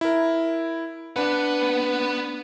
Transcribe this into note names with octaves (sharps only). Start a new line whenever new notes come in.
E4 A#4
B3 D4 B4 F#5